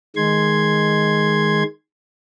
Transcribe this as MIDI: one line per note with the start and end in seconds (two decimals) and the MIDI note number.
0.16 1.63 51
0.16 1.63 56
0.16 1.63 84
0.16 1.63 92